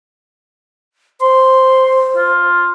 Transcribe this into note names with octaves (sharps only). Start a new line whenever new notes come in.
C5 C6
F4